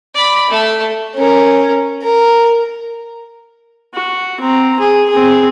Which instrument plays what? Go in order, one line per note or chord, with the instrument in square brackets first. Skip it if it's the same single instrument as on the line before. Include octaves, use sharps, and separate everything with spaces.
[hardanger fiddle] D5 B5
A3 A5
[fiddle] C#4 A#4
A#4
[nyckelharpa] F#4
C4 A#5
G#4
C4 G#4